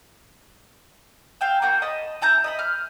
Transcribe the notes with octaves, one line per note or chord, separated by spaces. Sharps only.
F5 G5 E6
A#3 F#4 G5
D#5 A5 B5
E4 A5 A#5 G6
D#5 E5 B5
F6 G6